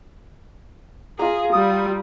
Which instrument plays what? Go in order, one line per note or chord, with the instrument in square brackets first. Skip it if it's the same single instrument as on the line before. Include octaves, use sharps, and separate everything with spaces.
[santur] F4 D#5 A#5 [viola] G#4
[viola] G3 [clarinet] D#6